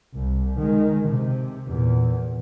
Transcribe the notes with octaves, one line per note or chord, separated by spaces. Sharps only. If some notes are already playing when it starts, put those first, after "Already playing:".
C2
D#3 G#3
C3
E2 A#2